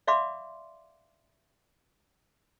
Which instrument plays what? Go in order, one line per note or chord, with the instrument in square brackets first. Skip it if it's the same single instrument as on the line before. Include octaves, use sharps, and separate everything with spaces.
[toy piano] D5 E5 F5 B5 C6 D6